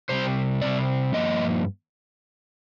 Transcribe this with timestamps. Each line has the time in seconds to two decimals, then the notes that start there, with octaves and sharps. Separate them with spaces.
0.09 C3 G3 C4 C5
0.61 C3 G3 C4 D5
1.14 G2 F3 A#3 D#5